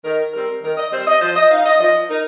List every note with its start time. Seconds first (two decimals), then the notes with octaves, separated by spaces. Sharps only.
0.04 D#3 A#4
0.34 G3 C4 A#4
0.63 D#3 A#4
0.77 D#5
0.92 G3 C4 C5
1.07 D#5
1.21 F3 C5
1.36 D#5
1.51 D#4 F5
1.66 D#5
1.80 F3 D#5
2.10 D#4 A#4